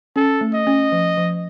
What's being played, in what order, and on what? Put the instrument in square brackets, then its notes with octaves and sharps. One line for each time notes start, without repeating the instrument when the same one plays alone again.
[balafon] C#4 [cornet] A4
[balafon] A3
[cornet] D#5
[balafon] C#4
F3
F3